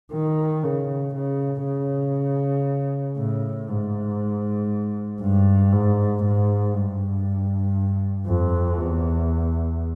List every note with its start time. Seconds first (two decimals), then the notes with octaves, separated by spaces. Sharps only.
0.13 D#3
0.63 C#3
1.15 C#3
1.65 C#3
3.17 A2
3.68 G#2
5.21 G2
5.73 G#2
6.23 G#2
6.74 G2
8.27 F2
8.78 E2